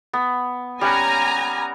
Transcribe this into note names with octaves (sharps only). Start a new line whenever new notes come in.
B3
G3 C#4 F#5 G#5 A#5